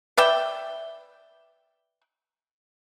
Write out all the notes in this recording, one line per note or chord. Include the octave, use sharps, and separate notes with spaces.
B4 D5 E5 G5